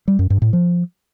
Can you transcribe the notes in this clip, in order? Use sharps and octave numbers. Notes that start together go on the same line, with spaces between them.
G3
F#2
G2
A2
F3